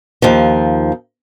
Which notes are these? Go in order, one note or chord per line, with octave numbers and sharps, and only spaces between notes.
D#2 F3